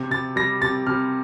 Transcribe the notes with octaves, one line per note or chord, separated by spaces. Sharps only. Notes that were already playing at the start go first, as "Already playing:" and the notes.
Already playing: C3
C3 A6
G3 A#6
C3 A6
C3 F6